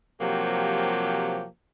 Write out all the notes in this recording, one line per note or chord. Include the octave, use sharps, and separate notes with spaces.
C3 F3 F#3 A#3 G4